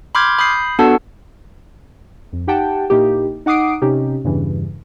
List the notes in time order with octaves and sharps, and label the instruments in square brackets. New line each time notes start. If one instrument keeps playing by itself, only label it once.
[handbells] B5 C6 D6 F6 G6 G#6
B5 D#6 G6 C7
B3 D4 F#4 A4 F#5 A5
[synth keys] F2
D#4 G4 F#5 G5 A5
A#2 A#3 D#4 E4 G4
D#4 F#5 D6 D#6 C7 D7
C3 C#4 D#4 G4
E2 G2 C#3 E3